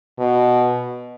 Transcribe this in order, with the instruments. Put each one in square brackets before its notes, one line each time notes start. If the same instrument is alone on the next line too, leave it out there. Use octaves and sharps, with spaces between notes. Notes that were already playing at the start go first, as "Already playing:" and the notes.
[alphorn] B2